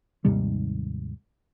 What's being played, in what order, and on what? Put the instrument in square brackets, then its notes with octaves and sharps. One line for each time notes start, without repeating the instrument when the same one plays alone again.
[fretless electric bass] D#2 G#2 C3 G3